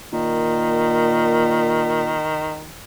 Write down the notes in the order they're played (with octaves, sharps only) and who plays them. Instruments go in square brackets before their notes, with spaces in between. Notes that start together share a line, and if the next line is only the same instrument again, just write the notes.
[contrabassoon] A#2 [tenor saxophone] D#3